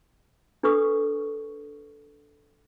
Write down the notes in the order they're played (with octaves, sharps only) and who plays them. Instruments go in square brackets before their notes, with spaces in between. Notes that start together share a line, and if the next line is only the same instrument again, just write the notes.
[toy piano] D4 A4 B4 C#6 D#6